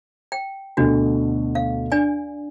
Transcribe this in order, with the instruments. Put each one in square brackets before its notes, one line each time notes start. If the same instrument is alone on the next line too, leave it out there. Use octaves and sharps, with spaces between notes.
[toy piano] G5
[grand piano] D2 B2 A4 [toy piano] D4 F#4
[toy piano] F5
D4 D5 G#5